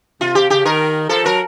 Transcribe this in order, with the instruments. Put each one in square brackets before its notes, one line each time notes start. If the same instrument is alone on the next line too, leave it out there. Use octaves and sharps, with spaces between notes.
[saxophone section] C3 [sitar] F4
[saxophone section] C3 [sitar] G4
[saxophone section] C#3 [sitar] G4
[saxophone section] D#3 [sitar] A#4
[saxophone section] F3 [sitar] A4
[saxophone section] F#3 [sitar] A#4